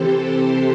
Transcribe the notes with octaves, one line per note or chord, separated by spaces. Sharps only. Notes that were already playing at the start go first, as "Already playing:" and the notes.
Already playing: C3 E3 C4 G4 A4 C5
C6